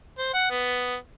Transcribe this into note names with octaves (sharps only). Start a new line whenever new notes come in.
C5
F#5
B3